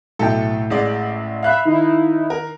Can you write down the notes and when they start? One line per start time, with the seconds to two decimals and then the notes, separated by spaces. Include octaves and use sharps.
0.19 B1 A2 A4 G5
0.70 A1 G#3 D5
1.43 E5 F5 B5 F#6
1.65 D#3 D#4 E4
2.30 A#4